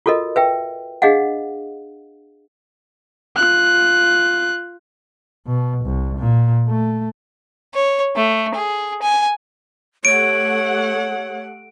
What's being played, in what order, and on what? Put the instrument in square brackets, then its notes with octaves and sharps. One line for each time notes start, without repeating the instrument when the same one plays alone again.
[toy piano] F4 F#4 A4 A#4 D#5
B4 E5 G5
D4 G#4 D#5 F5 F#5
[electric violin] F4 F#6
[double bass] B2
C2
A#2
A3
[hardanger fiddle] C#5
A3
G#4
G#5
[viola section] A3 G4 F#5 [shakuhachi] C#5 [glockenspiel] D7